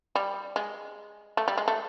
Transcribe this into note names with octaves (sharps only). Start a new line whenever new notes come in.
G3
G#3
A3
G3
G#3
A3